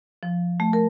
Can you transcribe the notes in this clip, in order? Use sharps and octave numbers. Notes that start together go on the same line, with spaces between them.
F3
A3
A#4